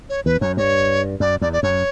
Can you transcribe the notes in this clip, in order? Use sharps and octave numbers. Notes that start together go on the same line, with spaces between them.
C#5
E2 B4
F#2 C#5
G2 C#5
F#2 D5
E2 D5
D5
F#2 C#5